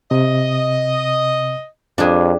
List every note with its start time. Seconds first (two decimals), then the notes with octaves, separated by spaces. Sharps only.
0.11 C3 D#5
1.98 F2 D4 G4 G#4